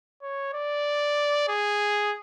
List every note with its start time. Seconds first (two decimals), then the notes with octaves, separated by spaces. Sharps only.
0.22 C#5
0.54 D5
1.48 G#4